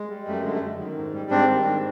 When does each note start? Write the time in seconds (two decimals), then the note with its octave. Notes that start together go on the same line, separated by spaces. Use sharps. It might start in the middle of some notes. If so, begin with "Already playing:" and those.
Already playing: G#3
0.10 G3
0.27 F#2 A3
0.40 D3 G#3
0.53 A3
0.62 F#2
0.79 D#3
0.96 G#2
1.13 G3
1.30 G#2 C4 D4
1.48 D#3
1.65 G#2